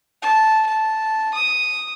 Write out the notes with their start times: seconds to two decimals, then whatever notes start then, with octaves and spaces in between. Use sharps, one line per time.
0.22 A5
0.66 A5
1.34 D#6